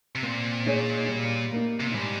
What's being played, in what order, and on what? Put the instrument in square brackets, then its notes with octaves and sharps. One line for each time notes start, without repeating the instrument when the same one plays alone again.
[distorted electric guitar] C3
[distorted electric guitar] A#2 [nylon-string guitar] C4
[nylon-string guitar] D#4 G#4 C#5
G3
A#3 D#4
[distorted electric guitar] C3
A#2
[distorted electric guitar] G#2 [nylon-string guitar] G3